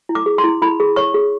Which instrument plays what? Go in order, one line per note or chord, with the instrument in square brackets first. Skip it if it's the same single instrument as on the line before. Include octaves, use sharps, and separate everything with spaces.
[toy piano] E4
D6
G#4
C6
E4
E4 B5
G#4
C#5 C#6
G#4